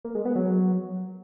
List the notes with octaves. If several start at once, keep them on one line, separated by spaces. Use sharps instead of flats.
A#3
G#3
B3
F#3